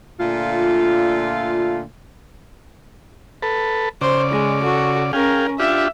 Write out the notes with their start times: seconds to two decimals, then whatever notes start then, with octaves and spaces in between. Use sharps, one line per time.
0.19 A#2 D3 A3 F4
3.42 A4 B4
4.01 C#3 C5 D5
4.32 G#3
4.62 F#4 A4
5.13 C#4 G#4 A#4 F5 G5
5.59 D4 F4 G4 E5